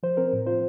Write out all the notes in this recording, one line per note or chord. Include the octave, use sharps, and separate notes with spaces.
F3 C5
C4 A#4
A2
F4 C5